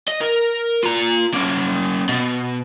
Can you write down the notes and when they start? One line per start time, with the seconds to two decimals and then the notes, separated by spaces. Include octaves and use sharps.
0.08 D#5
0.21 A#4
0.83 F4 A#5
1.34 A#3 C#4
2.09 B2